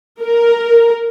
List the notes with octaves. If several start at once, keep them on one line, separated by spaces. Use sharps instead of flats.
A#4